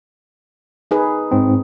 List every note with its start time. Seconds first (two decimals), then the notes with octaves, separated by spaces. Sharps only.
0.91 D#4 G#4 B4
1.31 G#2 C4